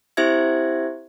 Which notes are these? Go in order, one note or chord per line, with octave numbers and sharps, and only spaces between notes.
C4 E4 G4 C5 E5 G#6